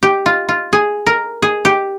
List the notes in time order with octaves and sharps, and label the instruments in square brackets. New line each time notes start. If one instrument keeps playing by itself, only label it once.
[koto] G4
F4
F4
G#4
A#4
G#4
G4